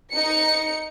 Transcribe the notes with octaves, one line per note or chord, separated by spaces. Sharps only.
D#4 C#7